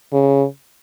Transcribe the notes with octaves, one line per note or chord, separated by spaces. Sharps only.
C#3